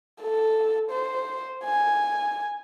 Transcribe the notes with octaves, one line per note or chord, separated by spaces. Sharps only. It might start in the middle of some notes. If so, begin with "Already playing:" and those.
A4
C5
G#5